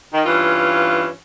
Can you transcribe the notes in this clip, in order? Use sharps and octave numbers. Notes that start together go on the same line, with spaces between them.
D#3
G2 E3 C#4 F4